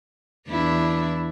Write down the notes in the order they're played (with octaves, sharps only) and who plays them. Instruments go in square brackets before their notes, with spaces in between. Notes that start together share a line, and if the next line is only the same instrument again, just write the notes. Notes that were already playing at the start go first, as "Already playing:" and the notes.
[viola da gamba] E2 D4 E4